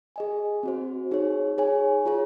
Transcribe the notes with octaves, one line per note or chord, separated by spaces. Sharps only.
G#4 D#5 G#5
C4 F#4 C5
D#4 G#4 C#5
G#4 C#5 G#5
F4 G#4 C#5